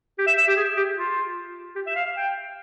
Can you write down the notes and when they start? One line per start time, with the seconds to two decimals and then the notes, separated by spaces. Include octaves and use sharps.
0.18 G4
0.27 E5
0.38 E5
0.47 G4
0.56 G#4
0.77 G4
0.97 F4
1.75 G4
1.87 E5
1.95 F5
2.05 F5
2.16 G5